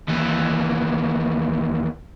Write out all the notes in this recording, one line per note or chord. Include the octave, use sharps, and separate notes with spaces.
D#2 E3